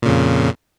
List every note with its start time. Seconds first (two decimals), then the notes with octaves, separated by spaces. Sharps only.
0.02 A#2
0.05 C#3
0.09 F2